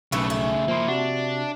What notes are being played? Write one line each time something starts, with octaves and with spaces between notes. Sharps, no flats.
B1 A2 C#3 E3 A3 A4 C#6
E5
F3 A#3 E4 C6
C3 D4 F#4